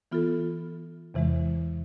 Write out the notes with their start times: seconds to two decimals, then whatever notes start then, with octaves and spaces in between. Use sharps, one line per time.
0.11 E3 B3 F4 A4
1.14 E2 C3 E3 G#3